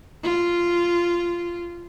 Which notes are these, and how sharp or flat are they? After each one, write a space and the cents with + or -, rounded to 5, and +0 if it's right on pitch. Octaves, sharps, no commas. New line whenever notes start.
F4 -10